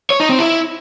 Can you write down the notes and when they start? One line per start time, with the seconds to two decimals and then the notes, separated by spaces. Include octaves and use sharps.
0.10 C#5
0.20 D#4
0.29 C4
0.39 E4